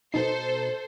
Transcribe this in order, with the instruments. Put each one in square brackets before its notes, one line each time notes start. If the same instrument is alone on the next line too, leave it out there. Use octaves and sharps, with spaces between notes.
[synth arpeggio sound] B2 D#4 C7 [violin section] A4 C5